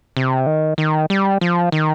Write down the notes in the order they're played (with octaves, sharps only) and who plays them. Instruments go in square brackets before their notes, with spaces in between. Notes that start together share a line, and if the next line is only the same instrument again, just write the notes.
[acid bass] C3
D#3
D#3
G3
F3
D#3